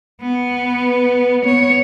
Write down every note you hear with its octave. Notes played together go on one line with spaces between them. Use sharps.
B3
B4
B3 C#5